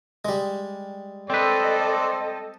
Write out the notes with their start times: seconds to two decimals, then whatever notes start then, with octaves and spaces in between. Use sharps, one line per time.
0.25 G3 G#3
1.30 C4 A4 B4 C5 D5 D#5